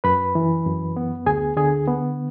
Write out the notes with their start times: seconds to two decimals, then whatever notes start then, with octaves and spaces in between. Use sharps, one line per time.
0.04 F#2 B4 B5
0.35 E3
0.66 F#2
0.96 B3
1.26 D2 G#4 G#5
1.57 D3 G#4 G#5
1.88 B3